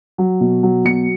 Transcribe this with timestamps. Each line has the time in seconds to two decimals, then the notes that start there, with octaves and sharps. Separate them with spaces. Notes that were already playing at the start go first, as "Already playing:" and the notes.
0.18 F#3
0.41 B2
0.63 F#3
0.85 B2 C#7